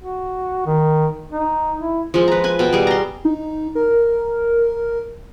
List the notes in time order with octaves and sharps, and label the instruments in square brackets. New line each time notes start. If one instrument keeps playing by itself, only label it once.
[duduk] F#4
D#3
D#4
E4
[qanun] F3 G#3
B4 A#5
B4 G#5
B2 G5
G3 G#4
A#5 C6
[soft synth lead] D#4
A#4